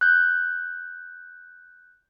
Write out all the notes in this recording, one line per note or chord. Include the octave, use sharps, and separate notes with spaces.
F#6 G6